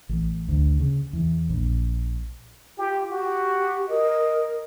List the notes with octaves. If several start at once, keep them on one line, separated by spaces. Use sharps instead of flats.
A1
D2
C#3
E2
A#1
F4 G4
F#4 G4
A#4 D#5